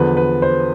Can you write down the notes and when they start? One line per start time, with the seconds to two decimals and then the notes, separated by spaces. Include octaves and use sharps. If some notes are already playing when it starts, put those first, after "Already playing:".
Already playing: E2 D3 F3 B4
0.17 B4
0.42 C5